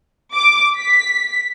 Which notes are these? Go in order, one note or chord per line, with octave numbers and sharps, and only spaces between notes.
D6
B6